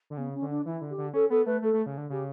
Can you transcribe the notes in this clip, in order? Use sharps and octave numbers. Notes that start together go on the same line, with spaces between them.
D3
C#3 B3
C#4
D3
D4
E3 E4
D3
G4
D3
C#4 A4
B3 A4
A3 B4
A3 A4
A3
C#3
D3
C#3 G4